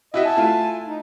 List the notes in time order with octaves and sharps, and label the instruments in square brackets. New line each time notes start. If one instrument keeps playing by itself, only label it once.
[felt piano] E4 F#4 E5 [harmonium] D#5
[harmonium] G#5 A5
[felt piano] A3 E4 F4
[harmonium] D#4